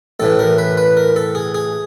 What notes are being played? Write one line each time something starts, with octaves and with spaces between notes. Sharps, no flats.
A1 A2 E3 A4
A#4
B4
B4
A#4
A4
G#4
G#4